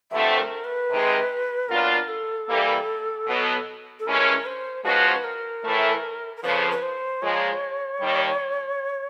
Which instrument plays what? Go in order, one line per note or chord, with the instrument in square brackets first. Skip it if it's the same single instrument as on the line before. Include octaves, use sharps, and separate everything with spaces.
[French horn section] G2 D3 F3 A3 C4 [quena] E5
[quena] A#4
B4
[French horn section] C3 D#3 G#3
[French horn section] A#2 F#3 B3 D4 F4 [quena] A#4
[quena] A4
[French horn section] E3 G3 A#3
B2 F#3 B3
[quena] A4
[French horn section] G2 E3 G#3 C#4 [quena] A#4
[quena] C5
[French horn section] G#2 F3 G#3 C#4 F#4 [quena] B4
[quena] C5
B4
A#4
[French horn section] A2 E3 A3
[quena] A#4
[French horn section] F2 C#3 F3 [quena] B4
[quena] B4
C5
[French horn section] A#2 F3 G#3 [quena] C#5
[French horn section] D#2 D#3 G3